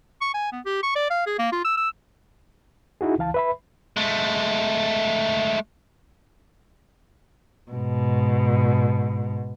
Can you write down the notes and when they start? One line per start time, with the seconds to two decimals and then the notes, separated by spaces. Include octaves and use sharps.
0.21 C#6
0.34 G#5
0.52 B3
0.66 G4
0.83 C#6
0.96 D5
1.10 F5
1.27 G#4
1.39 A#3
1.52 F4
1.65 E6
1.77 E6
3.01 D#4 E4 F#4 G#4
3.18 C#2 E3 F5 A5
3.34 B4 E5 B5
3.97 G#3 A3
7.72 G#2 B2